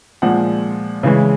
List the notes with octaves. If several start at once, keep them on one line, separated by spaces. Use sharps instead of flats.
A#2 F3 G#3 F#5
C#3 E3 G#3